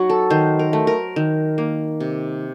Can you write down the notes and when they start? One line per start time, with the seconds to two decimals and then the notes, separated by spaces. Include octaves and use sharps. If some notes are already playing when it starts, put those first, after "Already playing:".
Already playing: F#3 D#4 F#4
0.10 A4
0.30 D#3 C5
0.59 A#4
0.73 A3
0.87 A#4
1.16 D#3
1.58 A#3
2.00 C3